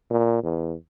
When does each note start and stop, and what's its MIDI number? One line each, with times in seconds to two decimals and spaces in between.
0.11 0.42 46
0.43 0.75 40